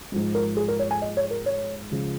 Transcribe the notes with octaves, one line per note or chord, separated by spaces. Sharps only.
G#2 F3 G#3
A#4
G#4
A#4
C#5
G#5
D#5
C#5
A#4
C#5
C#2 C#3 F3